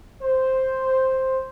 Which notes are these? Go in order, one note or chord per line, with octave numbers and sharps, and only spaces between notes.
C5